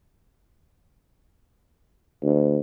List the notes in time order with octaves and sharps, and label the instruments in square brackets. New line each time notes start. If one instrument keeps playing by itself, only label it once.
[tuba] D2